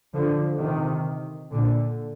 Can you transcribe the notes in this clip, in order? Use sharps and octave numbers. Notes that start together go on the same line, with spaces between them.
D3 F3
C3 D#3
A#2 D3